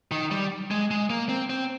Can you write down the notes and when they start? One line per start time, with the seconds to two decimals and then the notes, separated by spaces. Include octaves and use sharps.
0.11 D#3
0.31 G3
0.71 G#3
0.91 G#3
1.10 A#3
1.29 C4
1.50 C4